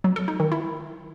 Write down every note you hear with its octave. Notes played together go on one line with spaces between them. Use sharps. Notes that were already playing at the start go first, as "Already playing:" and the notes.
F#3
A4
D#4
D#3
E4